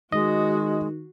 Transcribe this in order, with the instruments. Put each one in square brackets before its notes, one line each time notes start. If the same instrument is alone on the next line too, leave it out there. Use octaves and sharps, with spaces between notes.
[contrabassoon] D#3 [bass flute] G#3 [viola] F#4 [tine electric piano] D#5